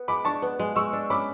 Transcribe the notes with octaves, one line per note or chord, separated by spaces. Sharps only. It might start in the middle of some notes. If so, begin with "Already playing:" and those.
Already playing: B3
G#3 B5 D6
D4 A5 C#6
B3
G#3
G#3 C#6 E6
D4
C#4 B5 D6